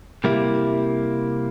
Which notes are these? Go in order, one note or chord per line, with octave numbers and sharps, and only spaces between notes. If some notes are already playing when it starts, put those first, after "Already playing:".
C3 G3 A#3 E4